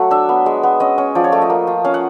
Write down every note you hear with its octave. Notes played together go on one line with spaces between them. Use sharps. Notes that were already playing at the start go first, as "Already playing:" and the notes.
Already playing: F#3 A3 F#5
D4 E5
B3
G#3
B3
C#4 D#5
C#4
F3 D5
C#5
A3 D5
D#5
A#3
F4
C#4 F5
F#5